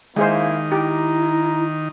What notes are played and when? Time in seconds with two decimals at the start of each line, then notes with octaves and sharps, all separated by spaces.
0.16 D#3 G#3 A#3 E4 G#4 C5 F5
0.72 E4 G4 A#5